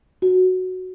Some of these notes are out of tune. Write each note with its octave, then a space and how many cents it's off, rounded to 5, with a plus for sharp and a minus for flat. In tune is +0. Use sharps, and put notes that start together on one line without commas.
F#4 +0